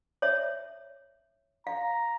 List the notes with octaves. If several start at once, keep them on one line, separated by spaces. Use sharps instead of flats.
C#5 E5
F5 A#5